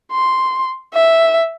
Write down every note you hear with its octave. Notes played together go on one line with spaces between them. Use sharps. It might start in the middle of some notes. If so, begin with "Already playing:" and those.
C6
E5